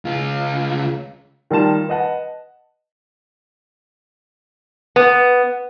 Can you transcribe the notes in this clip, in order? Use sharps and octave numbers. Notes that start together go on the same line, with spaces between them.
C#2 F4
D#3 G3 F4 A5 E7
B4 D#5 F#5 A5
B3